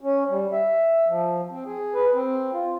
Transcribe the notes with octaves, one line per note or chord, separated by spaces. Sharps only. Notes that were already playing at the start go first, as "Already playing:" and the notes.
C#4
G3
E5
F3
C4
G#4
B4
C4
F4